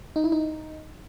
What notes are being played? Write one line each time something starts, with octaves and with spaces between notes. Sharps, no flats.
D#4
E4
D#4